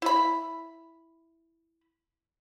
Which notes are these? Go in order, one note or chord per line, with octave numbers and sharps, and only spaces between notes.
E4 B5